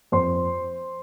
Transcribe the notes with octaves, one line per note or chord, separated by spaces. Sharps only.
F2 C5 C6